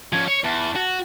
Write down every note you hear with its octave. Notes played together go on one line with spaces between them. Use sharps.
F3 C#4 G#6
C#5 C#7
E2 A5
F#4